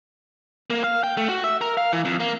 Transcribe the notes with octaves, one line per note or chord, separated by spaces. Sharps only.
A#3
F5
G5
A3
F#4
E5
A#4
F5
E3
F2
A#3